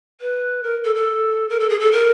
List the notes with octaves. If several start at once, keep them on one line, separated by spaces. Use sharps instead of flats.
B4
A#4
A4
A4
A#4
A4
G#4
A4
A#4